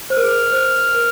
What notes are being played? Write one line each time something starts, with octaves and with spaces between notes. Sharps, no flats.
C5 F6
A#4
G#4
A#4
C5
A#4